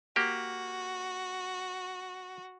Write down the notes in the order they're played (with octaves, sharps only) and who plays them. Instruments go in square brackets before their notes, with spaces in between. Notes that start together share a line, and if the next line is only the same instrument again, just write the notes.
[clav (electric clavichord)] A#3 G4 [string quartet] F#4